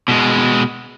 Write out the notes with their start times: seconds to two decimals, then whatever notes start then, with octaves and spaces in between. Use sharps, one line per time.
0.08 B2 G#3